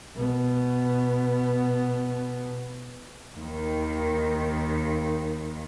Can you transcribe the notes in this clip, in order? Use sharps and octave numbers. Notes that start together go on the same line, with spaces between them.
B2 B3
D#2 D#3